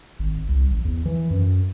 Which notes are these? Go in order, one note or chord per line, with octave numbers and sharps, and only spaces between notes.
G#1
C2
A1
E2
E3
F#2